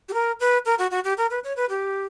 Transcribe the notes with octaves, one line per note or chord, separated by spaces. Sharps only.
G4
A#4
B4
A#4
F#4
F#4
G4
A#4
B4
C#5
B4
G4